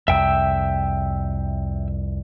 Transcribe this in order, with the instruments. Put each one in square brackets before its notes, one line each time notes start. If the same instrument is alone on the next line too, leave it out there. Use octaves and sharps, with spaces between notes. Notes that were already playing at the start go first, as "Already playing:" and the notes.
[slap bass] C2 F2 [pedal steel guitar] E5 G5 E6